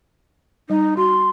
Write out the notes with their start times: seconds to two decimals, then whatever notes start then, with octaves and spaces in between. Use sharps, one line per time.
0.70 G3 D#4 D#5
0.97 F#4 C6